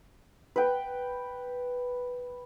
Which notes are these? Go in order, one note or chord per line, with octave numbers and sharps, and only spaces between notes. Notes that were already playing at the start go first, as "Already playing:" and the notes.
B4 G5